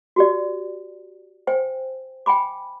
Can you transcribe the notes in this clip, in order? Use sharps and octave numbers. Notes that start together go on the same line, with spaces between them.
F#4 G4 D5
C5 G5 G#5
G5 G#5 B5 D6